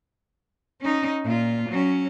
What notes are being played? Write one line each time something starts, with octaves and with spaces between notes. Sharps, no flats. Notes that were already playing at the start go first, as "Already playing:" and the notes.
C#4 D#4
A#2 F4
F#3 C#4